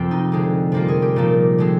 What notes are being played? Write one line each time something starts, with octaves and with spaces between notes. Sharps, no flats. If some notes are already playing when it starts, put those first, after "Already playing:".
Already playing: F2 C3 F3 C4 F4 G4
D#4
D3 G#3 C4
C3 G3 A#3 F4
G#4
G4
A#2 F3 A#3 D#4
D3 G#3 C4